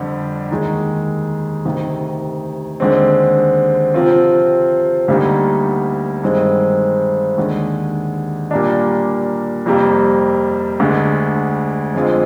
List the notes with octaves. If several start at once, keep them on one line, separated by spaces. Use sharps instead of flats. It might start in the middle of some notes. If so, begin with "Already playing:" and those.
Already playing: F2 D3 G3 D4 G4
D#2 D#3 G#3 D#4
D2 C3 D#3
D#2 D3 G#3 C4
C3 F3 C4 F4
D2 D3 G3 A#3 D#4
G2 D#3 G#3 C4
D#2 D3 G#3
A#2 G3 A#3 D4
F2 C3 G3 A#3
D2 D3 G#3
F2 D3 G#3 C4 F4